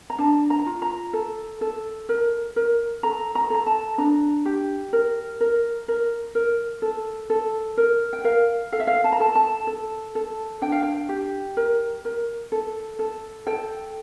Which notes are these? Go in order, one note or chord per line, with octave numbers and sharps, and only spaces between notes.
A#5
D4 A5
A#5
F4
A#5
A4
A4
A#4
A#4
A4 A#5
A#5
A4 A#5
A5
D4 A#5
G4
A#4
A#4
A#4
A#4
A4
A4
A#4
G5
A#4 F5
A4 F5
E5
F5
A5
A#5
A4 A5
A5
A4
A4
D4 G5
F5
G5
G4
A#4
A#4
A4
A4
A4 G5